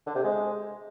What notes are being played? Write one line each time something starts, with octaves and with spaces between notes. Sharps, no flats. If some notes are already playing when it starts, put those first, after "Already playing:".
D3
C3
G#3